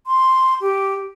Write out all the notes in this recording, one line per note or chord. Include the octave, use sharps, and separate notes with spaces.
C6
G4